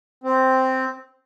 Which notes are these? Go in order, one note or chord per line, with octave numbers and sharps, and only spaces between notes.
C4